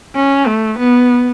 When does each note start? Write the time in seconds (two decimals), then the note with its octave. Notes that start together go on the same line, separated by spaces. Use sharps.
0.15 C#4
0.47 A3
0.79 B3